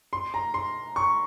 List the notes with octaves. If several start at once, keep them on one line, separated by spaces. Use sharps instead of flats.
C6
A#5
C6
C#6